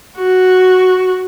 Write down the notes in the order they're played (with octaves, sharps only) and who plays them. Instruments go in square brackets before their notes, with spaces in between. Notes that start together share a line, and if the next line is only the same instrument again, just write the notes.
[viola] F#4